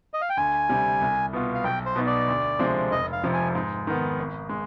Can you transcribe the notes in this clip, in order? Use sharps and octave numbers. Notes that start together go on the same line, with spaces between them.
D#5
F5
G5
D2 G#5
C3 G3
C2
B2 B3 F4
F5
B1 G5
C5
B2 B3 D#4
D5
D2
C3 F3 G#3 D4
F1 D#5
F5
F2 C3 F3
G#5
G#2
D#3 B3
G#1
G#3